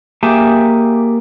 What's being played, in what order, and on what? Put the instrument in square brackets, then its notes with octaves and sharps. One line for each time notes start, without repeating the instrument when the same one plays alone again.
[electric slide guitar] A#3 G4 G#4 E5 G#5 A5